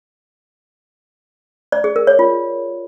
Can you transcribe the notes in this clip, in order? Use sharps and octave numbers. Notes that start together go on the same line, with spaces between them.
D5
G#4
A#4
C#5
F4